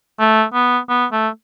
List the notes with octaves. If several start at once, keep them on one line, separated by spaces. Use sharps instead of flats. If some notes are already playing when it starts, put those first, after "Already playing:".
A3
B3
B3
A3